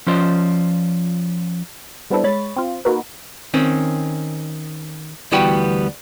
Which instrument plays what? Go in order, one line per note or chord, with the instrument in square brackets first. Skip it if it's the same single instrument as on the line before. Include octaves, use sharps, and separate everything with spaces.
[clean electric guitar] F3 C#4 F4 C5 D5 D#5
[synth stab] G3 B3 C4 D4 E4 A4
G#3 C#5 B5 A6
C4 F4
A#3 D#4 F#4 A#4 B4
[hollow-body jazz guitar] D#3 C4 C#4
D2 E3 G3 B3 F#4 G5